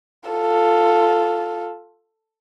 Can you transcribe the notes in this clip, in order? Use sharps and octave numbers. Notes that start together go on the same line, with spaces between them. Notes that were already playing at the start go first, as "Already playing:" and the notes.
F4 A4